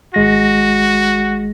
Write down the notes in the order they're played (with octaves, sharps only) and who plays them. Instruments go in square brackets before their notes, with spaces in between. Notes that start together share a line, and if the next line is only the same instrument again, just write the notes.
[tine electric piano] G#1 G#3 A#6 [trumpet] F#4